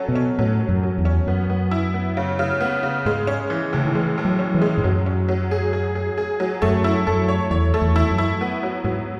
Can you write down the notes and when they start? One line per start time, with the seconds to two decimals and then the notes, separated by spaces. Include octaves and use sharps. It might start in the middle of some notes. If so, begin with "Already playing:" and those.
Already playing: F#3 C#4 A4
0.08 B2
0.15 C#4
0.39 A2 F#3
0.61 F#3
0.69 F#2
0.83 F#3
0.98 E2
1.05 C#4
1.27 F#2 B3
1.50 B3
1.71 E4
1.94 B3
2.17 C#3
2.39 C#3
2.61 B3
2.83 C#3
3.05 G#2 G#3
3.27 C#4
3.50 E3
3.73 A2 C#3
3.85 D#3
3.95 E3 G#3
4.18 A2
4.25 F#3
4.39 C#4
4.54 E3
4.62 G#3
4.78 G#2
4.84 F#2 F#3
5.06 C#4
5.29 F#3
5.51 G#4
5.73 G#4
5.95 G#4
6.18 G#4
6.40 F#3
6.62 F#2 A3
6.84 E4
7.07 F#2 A4
7.29 C#5
7.51 E2 C#5
7.74 A3
7.82 E2
7.96 E4
8.11 F#2
8.18 E4
8.41 B3
8.63 F#3
8.84 G#2 F#3